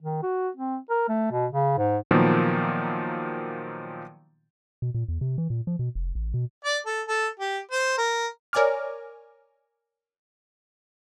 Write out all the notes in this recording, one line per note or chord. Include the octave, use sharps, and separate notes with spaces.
D#3
F#4
C4
A#4
A3
B2
C#3
G#2
A#2 D#3 F3 F#3 A#3 B3
B2
A#2
E2
C3
E3
A#2
F3
B2
F1
A1
B2
D5
A4
A4
G4
C5
A#4
A#4 C#5 D5 G#5 D6 F6